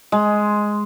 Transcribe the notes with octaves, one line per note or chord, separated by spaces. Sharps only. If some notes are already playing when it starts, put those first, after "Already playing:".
G#3